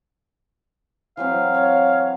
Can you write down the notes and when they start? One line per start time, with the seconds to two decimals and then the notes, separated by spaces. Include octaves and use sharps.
1.17 E3 F#3 C4 F5
1.53 C#5